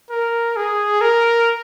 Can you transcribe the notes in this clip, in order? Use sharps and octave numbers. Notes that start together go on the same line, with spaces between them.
A#4
G#4
A#4